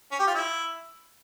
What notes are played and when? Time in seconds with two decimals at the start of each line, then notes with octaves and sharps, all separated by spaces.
0.12 C#4
0.20 G4
0.27 F4
0.35 E4